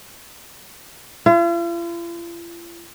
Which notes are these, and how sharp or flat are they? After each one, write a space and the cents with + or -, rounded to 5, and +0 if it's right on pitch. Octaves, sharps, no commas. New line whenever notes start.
F4 -45